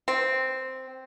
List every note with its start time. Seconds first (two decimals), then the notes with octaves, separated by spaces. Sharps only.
0.08 C4